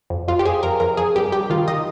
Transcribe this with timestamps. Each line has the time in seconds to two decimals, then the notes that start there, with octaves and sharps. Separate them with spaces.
0.10 F2
0.28 F2 F4
0.39 G4
0.45 F2 G#4
0.63 F2 A#4
0.80 F2 A#4
0.97 F2 G#4
1.16 G2 G4
1.32 G2 G4
1.50 D#3 F4
1.68 D#3 D#5